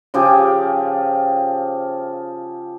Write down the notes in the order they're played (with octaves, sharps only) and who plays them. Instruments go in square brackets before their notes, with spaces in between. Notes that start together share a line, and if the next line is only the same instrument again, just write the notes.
[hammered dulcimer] C#3 F3 G4 G#4